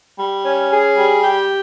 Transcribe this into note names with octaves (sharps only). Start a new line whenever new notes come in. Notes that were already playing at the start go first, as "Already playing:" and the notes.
G3
C#4
G#4
G3
G4